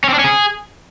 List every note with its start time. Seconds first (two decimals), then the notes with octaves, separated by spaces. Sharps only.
0.04 C#4
0.09 C4
0.14 D4
0.19 C#4
0.24 G#4